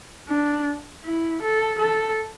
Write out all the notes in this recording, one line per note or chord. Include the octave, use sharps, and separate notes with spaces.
D4
E4
A4
A4